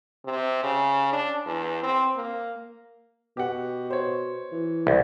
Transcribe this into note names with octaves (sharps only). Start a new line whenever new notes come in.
C3
C#3
D4
E2
C4
A#3
B2 G4 F#5
C5 C#5
E3
C2